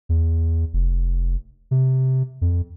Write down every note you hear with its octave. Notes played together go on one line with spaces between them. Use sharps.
E2
F1
C3
F2